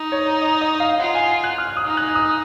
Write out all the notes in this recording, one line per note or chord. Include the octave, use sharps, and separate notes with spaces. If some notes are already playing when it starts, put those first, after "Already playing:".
Already playing: D#4
C#5
D#5
D#5
F5
F4 F#5
G#5
F#6
F6
D#6
D#4
F#6
D#6